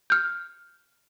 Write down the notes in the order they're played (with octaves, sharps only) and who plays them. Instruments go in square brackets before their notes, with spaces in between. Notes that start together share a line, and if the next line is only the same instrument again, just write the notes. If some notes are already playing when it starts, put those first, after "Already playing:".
[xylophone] F6 G6